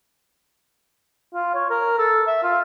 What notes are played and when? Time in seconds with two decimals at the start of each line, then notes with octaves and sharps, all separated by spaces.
1.34 F4
1.55 C#5
1.70 A#4
1.98 A4
2.27 E5
2.43 F4